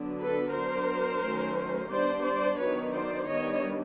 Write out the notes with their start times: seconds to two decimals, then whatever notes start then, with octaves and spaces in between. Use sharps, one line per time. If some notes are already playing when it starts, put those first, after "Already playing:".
Already playing: D3 F#3 B3 D4
0.20 A4 B4
0.54 F#3 B3 D4 A#4 C5
1.22 D#3 F#3 A3 C#4
1.91 G3 B3 D4 C5 D5
2.25 C5 D5
2.59 D#3 F#3 B3 D4 B4 C#5
2.94 C5 D5
3.28 D#3 G3 B3 D4 C#5 D#5